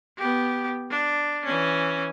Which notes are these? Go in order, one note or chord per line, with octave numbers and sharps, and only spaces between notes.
B3 G4
D4
E3 C#4